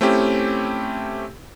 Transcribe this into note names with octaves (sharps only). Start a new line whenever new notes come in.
A3 C4 C#4 E4 G4